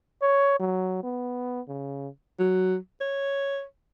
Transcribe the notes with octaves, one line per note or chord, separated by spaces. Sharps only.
C#5
F#3
B3
C#3
F#3
C#5